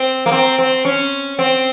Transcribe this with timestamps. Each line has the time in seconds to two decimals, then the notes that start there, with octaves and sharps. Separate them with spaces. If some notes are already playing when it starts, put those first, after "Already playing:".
Already playing: C4
0.26 A#3
0.32 C4
0.59 C4
0.85 C#4
1.39 C4